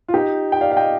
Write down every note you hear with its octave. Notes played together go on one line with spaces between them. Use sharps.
F4
D#4 G4
G5
D5 F5
F5
D#5 G5